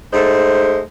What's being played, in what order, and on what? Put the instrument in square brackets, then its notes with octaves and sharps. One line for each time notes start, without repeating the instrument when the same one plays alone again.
[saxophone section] G#2 G#3 A3 C5